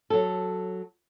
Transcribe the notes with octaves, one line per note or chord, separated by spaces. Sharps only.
F#3 A4